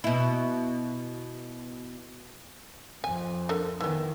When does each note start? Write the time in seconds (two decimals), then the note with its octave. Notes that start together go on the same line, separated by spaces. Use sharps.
0.04 B2 E4
3.04 F2 G#5
3.49 D3 A#4
3.80 D#3 E3 B3